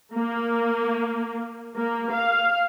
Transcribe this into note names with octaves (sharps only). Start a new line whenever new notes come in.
A#3
A#3
F5